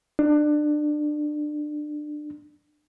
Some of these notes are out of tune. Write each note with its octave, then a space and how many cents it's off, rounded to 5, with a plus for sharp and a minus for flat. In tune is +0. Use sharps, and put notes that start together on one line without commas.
D4 +25